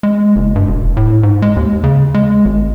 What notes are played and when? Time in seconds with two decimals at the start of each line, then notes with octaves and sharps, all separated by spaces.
0.03 G#3
0.36 F#1
0.56 G2
0.67 E1
0.97 A2
1.23 G#2
1.42 G#3
1.57 D#2
1.84 C#3
2.14 G#3
2.45 G#1